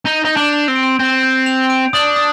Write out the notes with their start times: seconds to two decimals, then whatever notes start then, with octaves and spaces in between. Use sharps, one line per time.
0.05 D#4 G6
0.25 D#4 G6
0.37 D4
0.53 F7
0.68 C4
0.75 D7
0.99 C4 G6
1.23 G6
1.46 F7
1.70 D7
1.93 D4 D#6
2.16 D#6